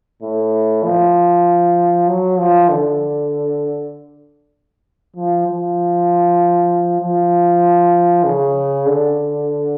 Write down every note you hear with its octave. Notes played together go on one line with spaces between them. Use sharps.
A2
F3
F#3
F3
D3
F3
F3
F3
C#3
D3